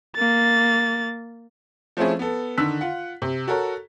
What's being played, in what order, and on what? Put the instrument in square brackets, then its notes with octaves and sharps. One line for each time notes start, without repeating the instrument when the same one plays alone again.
[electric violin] A#3 A6
[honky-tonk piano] F3 A3 C4 C#4 E4 G#4
B3 A4
D3 D#3 E6 F#6 B6
F4 F#5
C3
F#4 A4 A#4 C#5